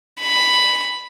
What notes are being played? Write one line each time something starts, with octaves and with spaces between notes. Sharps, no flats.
B5